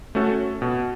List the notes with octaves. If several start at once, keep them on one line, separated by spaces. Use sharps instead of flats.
A3 C#4 F#4 A4
B2